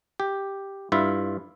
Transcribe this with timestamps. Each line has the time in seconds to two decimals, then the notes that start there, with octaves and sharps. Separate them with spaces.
0.20 G4
0.92 G2 E4 F4 E5